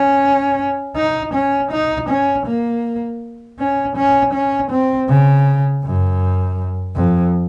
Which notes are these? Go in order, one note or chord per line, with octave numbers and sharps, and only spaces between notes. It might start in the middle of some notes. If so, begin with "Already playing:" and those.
Already playing: C#4
D#4
C#4
D#4
C#4
A#3
C#4
C#4
C#4
C4
C#3
F#2
F2